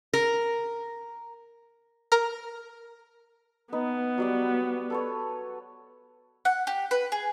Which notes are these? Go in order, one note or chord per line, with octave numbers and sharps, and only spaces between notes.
A#4
A#4
B3 D#4 B4
F#3 G3 D5
A4 B4 C#5
F#5
G4
B4
G#4